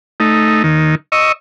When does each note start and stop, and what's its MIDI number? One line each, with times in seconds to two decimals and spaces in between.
0.20 0.63 57
0.20 0.63 63
0.64 0.95 39
0.64 0.95 51
1.12 1.32 75
1.12 1.32 85
1.12 1.32 88